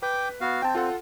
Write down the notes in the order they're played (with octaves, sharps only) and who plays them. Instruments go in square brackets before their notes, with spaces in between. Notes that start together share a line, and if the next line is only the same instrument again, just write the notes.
[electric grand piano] B4 [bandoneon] G5 D6
[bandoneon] B3 F#4 F5
[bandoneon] C4 [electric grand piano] G5 A5
[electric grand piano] F4 A4 F#5